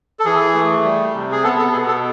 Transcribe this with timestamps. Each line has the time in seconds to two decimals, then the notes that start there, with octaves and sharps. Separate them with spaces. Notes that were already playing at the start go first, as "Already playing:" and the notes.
0.19 A4
0.25 E3 G#4
0.54 A3
0.84 G3
1.14 C3
1.32 G#4
1.44 B3 A4
1.59 A4
1.73 B2 G#4
1.88 A4